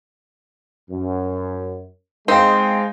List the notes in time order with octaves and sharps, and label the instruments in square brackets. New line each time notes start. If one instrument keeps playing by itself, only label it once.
[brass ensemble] F#2
[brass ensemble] G#3 [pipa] C4 [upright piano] D#4 F5 G5